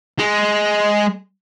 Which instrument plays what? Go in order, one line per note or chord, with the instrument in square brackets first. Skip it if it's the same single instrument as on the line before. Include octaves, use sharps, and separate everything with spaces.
[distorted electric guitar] G#3